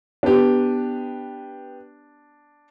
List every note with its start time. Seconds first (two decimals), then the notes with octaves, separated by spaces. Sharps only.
0.23 B3 D4 G4